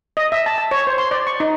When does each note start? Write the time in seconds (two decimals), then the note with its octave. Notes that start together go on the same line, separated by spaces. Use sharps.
0.17 D#5
0.32 E5
0.46 A5
0.58 A5
0.71 C#5
0.87 C5
0.98 C6
1.11 D5
1.27 C#6
1.40 D#4